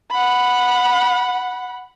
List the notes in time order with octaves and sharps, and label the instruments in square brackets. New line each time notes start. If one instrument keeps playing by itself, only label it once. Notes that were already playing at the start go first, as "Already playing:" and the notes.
[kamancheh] F#5 B5